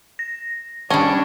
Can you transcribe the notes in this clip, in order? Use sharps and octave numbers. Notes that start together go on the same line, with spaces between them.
A#6
G3 C#4 D4 D#5 A5 G#6